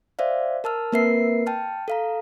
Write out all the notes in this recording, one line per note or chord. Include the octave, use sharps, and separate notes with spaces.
C5 D5 E5 F5
A#4 A5 E6 F6
A#3 C4 A#4 B4 E5 C7
G5 A5 F6
A4 F5 A#5